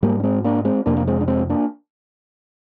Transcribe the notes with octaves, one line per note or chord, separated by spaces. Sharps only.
G#2 G3 A#3
D4
G#3 C4
A#3 D4
G#3 C4
F2 C3 A#3 D4
A#3
G#3 C4
D4
G#3 C4
A#3 D4